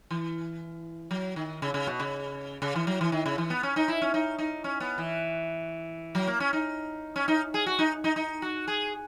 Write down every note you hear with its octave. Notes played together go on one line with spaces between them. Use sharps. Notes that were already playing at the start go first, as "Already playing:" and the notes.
E3
F#3
D#3
C#3
C#3
B2
C#3
C#3
E3
F#3
E3
D#3
C#3
E3
B3
C#4
D#4
E4
C#4
D#4
D#4
C#4
B3
E3
F#3
A#3
C#4
D#4
C#4
D#4
G#4
F#4
D#4
D#4
D#4
F#4
G#4